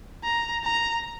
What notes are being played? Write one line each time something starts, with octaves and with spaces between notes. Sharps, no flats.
A#5
A#5